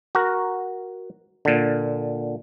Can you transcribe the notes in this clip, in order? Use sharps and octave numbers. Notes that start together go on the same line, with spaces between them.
F#4 A#4
A#2 D3